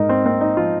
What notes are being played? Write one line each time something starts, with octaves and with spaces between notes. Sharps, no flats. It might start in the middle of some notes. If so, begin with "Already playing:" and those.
Already playing: G#2 D#4 A#4
C4
A#3 C4
D#4
F3 F4